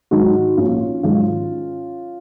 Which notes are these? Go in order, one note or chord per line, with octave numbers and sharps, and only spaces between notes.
G#2 D#3 F#3 D#4 F#4
A#1 C#4 F4
G#2 D#3 F#3 C#4 F4